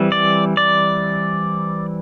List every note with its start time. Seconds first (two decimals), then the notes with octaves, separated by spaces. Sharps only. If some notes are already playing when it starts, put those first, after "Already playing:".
Already playing: E3 G3 C4
0.12 D5
0.57 D5